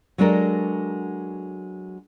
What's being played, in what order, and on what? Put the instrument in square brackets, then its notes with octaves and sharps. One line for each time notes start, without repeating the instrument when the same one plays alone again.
[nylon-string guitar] F#3 G#3 D4 A4 A#4